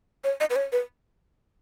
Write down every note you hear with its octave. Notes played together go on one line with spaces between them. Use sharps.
C#5
D#5
B4
C#5
B4